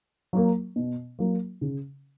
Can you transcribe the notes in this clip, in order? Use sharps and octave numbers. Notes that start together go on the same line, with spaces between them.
F#3 A#3
B2
F#3 A#3
C#3